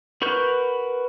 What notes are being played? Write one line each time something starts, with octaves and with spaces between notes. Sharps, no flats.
F#4 A#4 B4 C#6 G6